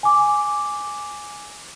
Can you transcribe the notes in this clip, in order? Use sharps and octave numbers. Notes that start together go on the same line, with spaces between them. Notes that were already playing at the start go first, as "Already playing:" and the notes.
G#5 D6